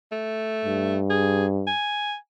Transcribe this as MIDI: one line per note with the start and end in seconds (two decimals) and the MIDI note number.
0.12 0.98 57
0.65 1.71 43
1.10 1.46 68
1.67 2.15 80